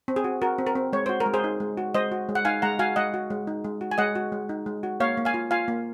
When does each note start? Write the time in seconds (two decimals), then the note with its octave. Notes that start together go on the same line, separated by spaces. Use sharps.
0.08 C4
0.16 G#4
0.24 F#4
0.42 F#4 A#4
0.58 C4
0.67 A#4
0.75 C4
0.93 G#3 C#5
1.06 F#4 C5
1.20 A#4
1.26 G#3
1.34 G#4 C5
1.44 D#4
1.60 G#3
1.77 F#4
1.94 G#3 C5 D#5
2.12 F#4
2.29 G#3
2.35 F#5
2.45 D#4 F5 G#5
2.62 G#3 F#5 A#5
2.79 F#4 F5 G#5
2.96 G#3 D#5 F#5
3.14 F#4
3.30 G#3
3.47 D#4
3.64 G#3
3.81 F#4
3.91 G#5
3.98 G#3 D#5 F#5
4.15 F#4
4.32 G#3
4.49 D#4
4.66 G#3
4.83 F#4
5.00 A#3 C#5 F5
5.17 A#3
5.25 F5 G#5
5.34 F4
5.51 F4 F5 G#5
5.68 A#3